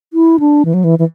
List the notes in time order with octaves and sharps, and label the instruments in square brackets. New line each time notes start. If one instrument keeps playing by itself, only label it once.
[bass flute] E4
D4
E3
F#3
E3
E3